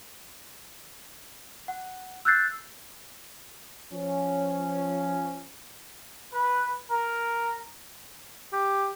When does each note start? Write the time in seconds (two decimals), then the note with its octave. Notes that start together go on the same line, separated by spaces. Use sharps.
1.68 F#5
2.25 E6 F#6 G6 A6 C7
3.93 F3 C#4
6.33 B4
6.90 A#4
8.53 G4